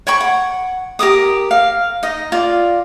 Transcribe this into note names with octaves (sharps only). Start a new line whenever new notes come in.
C#5 G5 B5 C#6
F#5
G4 A#4 D6 D#6
F5
D#4 D#5
F4 D5